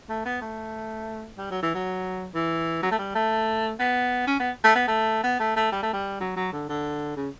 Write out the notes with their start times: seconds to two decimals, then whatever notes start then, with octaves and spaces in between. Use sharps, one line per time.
0.09 A3
0.25 B3
0.41 A3
1.38 G3
1.51 F#3
1.62 E3
1.74 F#3
2.34 E3
2.83 F#3
2.91 A3
2.98 G3
3.15 A3
3.79 B3
4.27 C#4
4.39 B3
4.64 A3
4.75 B3
4.88 A3
5.24 B3
5.40 A3
5.56 A3
5.72 G3
5.83 A3
5.93 G3
6.20 F#3
6.36 F#3
6.52 D3
6.69 D3
7.17 C#3